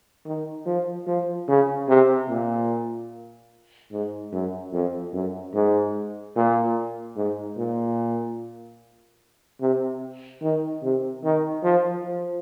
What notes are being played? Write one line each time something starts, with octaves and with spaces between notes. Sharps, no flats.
D#3
F3
F3
C#3
C3
A#2
G#2
F#2
F2
F#2
G#2
A#2
G#2
A#2
C3
D#3
C3
D#3
F3
F3